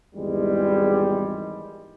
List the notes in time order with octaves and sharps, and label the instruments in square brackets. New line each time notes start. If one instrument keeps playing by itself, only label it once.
[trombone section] G#1 E2 G3 G#3